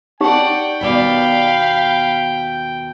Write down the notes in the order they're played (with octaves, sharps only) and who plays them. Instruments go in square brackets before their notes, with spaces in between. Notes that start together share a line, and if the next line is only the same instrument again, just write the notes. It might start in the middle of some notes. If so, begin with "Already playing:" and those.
[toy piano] D#4 G4 [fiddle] D5 F#5 [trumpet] G5
[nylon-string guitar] D#2 B2 D5 [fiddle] F5 B5